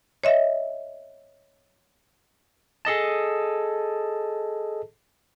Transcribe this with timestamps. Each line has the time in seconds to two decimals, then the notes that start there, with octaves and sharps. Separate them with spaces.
0.24 C#5 D#5 E5
2.85 G#4 A4 D#5 A5